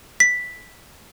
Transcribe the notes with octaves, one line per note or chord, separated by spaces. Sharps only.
B6